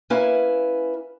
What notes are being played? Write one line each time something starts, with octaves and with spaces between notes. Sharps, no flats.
A#3 C#4 E4 B4 G#5